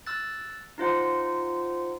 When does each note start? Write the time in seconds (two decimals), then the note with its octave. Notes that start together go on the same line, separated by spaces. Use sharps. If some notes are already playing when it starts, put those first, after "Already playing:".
0.07 E6 F#6 A6
0.78 D#4 F4 C5 F#5